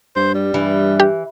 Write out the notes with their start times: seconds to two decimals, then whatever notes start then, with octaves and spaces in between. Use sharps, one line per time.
0.16 G2 C5
0.35 G3
0.54 G2 E3
1.00 G4